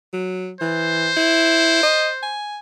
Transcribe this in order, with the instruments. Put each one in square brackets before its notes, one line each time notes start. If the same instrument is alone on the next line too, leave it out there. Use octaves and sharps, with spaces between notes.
[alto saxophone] F#3
[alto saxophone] E3 [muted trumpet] C5
[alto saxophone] E4
D#5
G#5